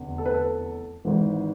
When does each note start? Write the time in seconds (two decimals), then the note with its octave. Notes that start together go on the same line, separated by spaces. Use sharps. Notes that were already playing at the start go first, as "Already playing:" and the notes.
Already playing: F1 E2 D3
0.18 A4
0.26 B4
0.34 A4
1.05 G#1 G#2 E3